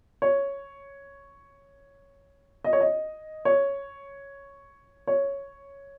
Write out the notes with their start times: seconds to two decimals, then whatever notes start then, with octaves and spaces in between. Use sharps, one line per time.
0.22 C#5
2.64 D#5
2.73 C#5
2.80 D#5
3.45 C#5
5.07 C#5